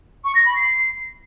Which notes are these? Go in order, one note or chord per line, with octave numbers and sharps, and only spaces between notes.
C#6
A#6
B5
C7